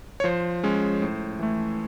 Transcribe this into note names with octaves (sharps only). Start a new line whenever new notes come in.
C#5
F3 C5
G#3 C#4
A2
E3 A3